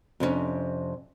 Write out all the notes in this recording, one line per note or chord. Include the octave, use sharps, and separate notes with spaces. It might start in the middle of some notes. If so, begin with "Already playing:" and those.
F2 C3 G#3 C#4 D4